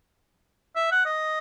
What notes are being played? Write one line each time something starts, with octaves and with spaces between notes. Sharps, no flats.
E5
F#5
D#5